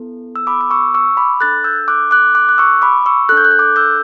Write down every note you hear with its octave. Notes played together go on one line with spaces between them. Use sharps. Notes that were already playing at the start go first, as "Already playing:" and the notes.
Already playing: B3 E4 A4
E6
B5 D6
D6
C#6 E6
C#6 E6
B5 D6
D4 A4 F#6 A6
E6 G6
D6 F#6
D6 F#6
D6 F#6
F#6
C#6 E6
B5 D6
C#6 E6
D4 A4 F#6
G6
F#6
G6
D6 F#6
E6 G6